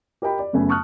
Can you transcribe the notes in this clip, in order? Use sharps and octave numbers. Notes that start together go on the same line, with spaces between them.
G4 A#4 D#5 G5 B5
D5
F#2 C#3 A3 B3 G#5
A5 C#6 D#6 F6 F#6